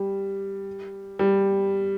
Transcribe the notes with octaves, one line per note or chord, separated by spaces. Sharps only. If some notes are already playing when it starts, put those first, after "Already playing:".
Already playing: G3
G3